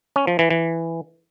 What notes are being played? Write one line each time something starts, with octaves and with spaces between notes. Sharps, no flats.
C#4
F3
E3
E3